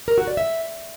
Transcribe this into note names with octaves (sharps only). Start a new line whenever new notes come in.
A#4
F#4
D5
E5